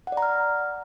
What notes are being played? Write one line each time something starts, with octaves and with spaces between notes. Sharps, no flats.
F#5
D5
A#5
F6